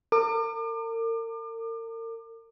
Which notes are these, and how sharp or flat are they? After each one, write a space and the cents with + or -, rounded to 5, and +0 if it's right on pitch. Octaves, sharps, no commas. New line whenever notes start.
A#4 -40 D6 +35